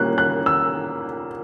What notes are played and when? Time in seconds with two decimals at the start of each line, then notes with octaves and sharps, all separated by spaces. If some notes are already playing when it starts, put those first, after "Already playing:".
Already playing: A#2 G3 A#3 C#4 F#6
0.18 F#6
0.46 E6